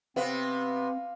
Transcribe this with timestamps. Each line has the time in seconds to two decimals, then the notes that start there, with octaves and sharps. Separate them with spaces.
0.16 C3 B3 C4 F5